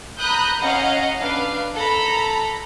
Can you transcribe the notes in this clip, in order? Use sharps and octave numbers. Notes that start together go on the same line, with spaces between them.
A#5 B5 D#6 F#6 G6
C#4 D#5 F5 F#5 A#5
D4 B4 F5
A4 A#5 B5